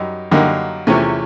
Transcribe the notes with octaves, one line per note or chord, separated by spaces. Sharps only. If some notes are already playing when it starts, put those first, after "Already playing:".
Already playing: F#2 G3 D#4
F#2 D3 G3 A#3 D#4
E2 C3 F3 A3 C#4